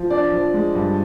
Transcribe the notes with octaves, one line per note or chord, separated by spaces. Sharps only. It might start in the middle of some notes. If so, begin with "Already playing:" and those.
Already playing: F3
D4 D5
F3
G#3
G2